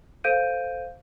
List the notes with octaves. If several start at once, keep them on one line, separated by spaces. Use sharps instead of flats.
A4 C5 F5 G6 D7 D#7